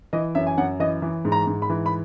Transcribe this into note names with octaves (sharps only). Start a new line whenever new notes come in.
E3 D#5
F#2 E5
G#5
F#2 F#5
E3 D#5
E3
G#2
A#5
G#2
B5
E3
B5